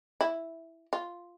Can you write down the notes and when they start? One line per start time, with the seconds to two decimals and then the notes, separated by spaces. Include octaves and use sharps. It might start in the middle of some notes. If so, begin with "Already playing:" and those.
0.21 E4
0.93 F4